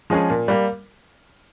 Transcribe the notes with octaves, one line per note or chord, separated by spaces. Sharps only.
F3 G#3 C#4 G#4
A#2
G3 A#3